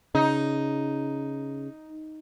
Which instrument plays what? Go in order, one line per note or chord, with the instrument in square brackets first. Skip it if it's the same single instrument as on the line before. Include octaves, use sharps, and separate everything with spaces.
[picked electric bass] C#3 [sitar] D#4